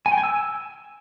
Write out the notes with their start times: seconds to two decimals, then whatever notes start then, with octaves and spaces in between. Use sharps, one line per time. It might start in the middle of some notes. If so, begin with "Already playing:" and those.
0.06 G#5
0.12 G5
0.18 G#5
0.24 E6